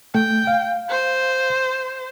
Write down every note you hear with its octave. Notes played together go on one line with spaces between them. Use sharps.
A3 G5
F5
C5